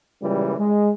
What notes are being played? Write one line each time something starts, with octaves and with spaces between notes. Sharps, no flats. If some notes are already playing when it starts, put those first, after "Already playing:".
C#2 A#2 E3 G3
G#3